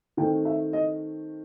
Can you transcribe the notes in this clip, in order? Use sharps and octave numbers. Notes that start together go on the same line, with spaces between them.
D#3 A3 C4 G5
E5
D#5